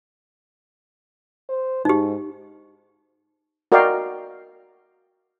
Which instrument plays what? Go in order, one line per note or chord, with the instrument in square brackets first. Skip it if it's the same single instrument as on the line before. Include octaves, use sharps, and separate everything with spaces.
[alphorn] C5
[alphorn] G#2 [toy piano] D#4 G4
[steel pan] F#4 A#4 D5 D#5 F5 G5